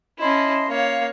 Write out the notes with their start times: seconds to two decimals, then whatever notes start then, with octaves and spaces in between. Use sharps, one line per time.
0.20 C#4 E4 D#5 A5 C6
0.69 A#3 C#5 F5